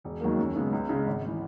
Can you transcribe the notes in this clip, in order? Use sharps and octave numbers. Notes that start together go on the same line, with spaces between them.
E1
D#2 D#3 F#3 A#3
F#2
C#3 G#3 B3
C#2
C#3 G#3
G#1
E3